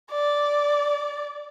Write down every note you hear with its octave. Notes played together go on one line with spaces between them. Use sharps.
D5